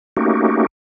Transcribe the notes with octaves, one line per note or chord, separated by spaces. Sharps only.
A3 A#3 C#4 D#4 F#4 G4